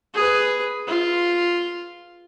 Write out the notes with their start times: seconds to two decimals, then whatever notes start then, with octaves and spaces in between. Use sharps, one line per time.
0.14 G#4 B4
0.88 F4